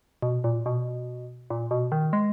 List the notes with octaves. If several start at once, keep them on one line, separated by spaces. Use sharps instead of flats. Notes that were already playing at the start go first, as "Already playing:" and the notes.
B2
A#2
B2
A#2
B2
D#3
G#3